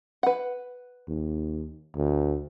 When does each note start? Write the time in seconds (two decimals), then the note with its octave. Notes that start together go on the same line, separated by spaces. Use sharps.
0.23 B4 F#5
1.08 D#2
1.96 D2